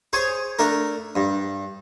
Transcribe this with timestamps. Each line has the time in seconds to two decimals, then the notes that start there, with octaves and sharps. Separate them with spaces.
0.13 G#4 C5 C#5 G#5
0.59 A3 D4 A#4
1.15 G2